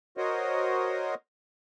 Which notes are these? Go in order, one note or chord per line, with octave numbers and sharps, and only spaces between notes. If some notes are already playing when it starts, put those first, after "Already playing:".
F#4 A#4 C5 C#5 D#5